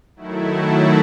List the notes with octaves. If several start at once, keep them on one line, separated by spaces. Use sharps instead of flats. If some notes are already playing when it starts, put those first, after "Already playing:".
D#3 F#3 A3 E4